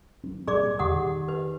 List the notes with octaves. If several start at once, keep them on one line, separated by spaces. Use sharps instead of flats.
F#3 C4
A#2 G3 G#4 D5 D6
E2 D3 E3 G4 F#5 D#6
D#3
B4